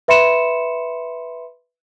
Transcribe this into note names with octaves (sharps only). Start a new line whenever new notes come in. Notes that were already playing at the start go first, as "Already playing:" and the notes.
B4 E5 B5 C6 C#7 E7